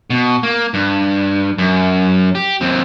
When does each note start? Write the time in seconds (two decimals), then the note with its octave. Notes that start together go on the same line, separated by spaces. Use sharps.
0.10 B2
0.43 A#3
0.74 G2
1.58 F#2
2.35 G4
2.61 D#2 C4